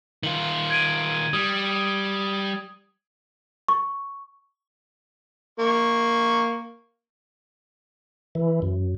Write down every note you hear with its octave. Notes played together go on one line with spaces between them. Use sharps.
D#3 F4 F#7
G#6 D7 D#7
G3 D#6
C#6
A#3 C#6
E3
F#2